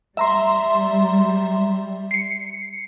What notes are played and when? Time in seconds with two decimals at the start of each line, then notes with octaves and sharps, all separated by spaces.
0.17 G3 E5 A#5 C6
2.11 C7 C#7